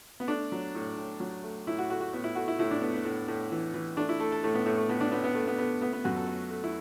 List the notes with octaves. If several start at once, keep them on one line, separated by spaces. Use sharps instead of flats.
B3
A3 D4
F#3
A2
A2
F#3
A3
A2 E4
F#4
A3 F#4
F#4
A2 B3
E4
A3 F#4
E4
A2 E4
D4
A3 B3
B3
A2
A2
E3
E3
A3 D4
E4
A3 A4
A4
A2 A3
B3
A2 A3
A3
A2 B3
D4
A2 B3
B3
A3
B3
A3 B3
A3 B3
B3
F#2 F#4
A4
A3
A3
E4